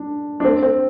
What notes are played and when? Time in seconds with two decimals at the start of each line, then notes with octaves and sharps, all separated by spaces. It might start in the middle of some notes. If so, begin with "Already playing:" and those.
Already playing: D4
0.40 D4
0.45 C4
0.63 C4